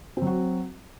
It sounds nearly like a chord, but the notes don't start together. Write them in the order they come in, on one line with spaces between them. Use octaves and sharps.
C4 F#3 F#4